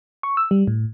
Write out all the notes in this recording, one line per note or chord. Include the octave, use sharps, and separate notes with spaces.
C#6
E6
G3
A2